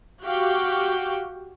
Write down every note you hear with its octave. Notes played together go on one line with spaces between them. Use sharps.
F#4 G4 F5 G5